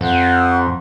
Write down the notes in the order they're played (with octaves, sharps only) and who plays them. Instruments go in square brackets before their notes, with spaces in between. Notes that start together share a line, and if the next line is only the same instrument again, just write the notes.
[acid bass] F2 [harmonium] C5 F#5